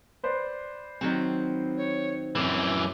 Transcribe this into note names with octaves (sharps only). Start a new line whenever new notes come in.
B4 C5 D5
D#3 F#3 C4
C#5
F#2 E3 C4 D6